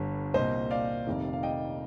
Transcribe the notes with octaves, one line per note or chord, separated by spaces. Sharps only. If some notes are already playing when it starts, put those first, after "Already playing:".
Already playing: G1 G2 D3
C2 A#2 C5 D#5
D5 F5
F1 F2 C3 D#3
F5
D#5 G5